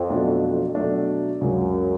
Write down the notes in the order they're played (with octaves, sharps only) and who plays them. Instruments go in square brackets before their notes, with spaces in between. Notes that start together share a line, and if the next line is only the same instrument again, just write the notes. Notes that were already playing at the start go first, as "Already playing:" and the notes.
Already playing: [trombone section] F2
[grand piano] B2 F#3 A3 D4
B2 F#3 A3 D4
[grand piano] C#2 C#3 F#3 [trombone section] F#2